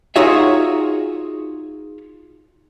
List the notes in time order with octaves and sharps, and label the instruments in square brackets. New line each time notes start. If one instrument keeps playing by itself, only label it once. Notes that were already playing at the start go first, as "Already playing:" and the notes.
[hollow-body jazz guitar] D#4 F4 F#4 G#4 C#5 E5